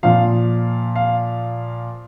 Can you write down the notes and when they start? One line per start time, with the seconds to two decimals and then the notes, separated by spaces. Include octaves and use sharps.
0.03 A#2 F3 F5
0.95 F5